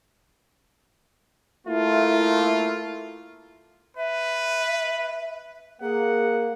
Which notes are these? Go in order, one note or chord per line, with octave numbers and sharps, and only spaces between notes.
A3 A#3 E4 F4
B4 E5
A#3 G#4 F#5